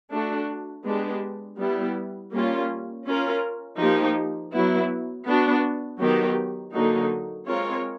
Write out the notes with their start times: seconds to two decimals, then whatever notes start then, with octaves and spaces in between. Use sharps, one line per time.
0.11 A3 D4 F#4
0.85 G#3 B3 D4 G4
1.58 G3 B3 E4
2.32 G3 A#3 C#4 F4
3.06 C#4 F4 A#4
3.79 F3 A#3 D#4 G4
4.52 F#3 B3 E4
5.26 B3 D4 F#4
5.99 D#3 F#3 B3 D#4 G4
6.73 D3 F#3 A#3 D#4
7.47 G#3 C4 F4 A#4 C#5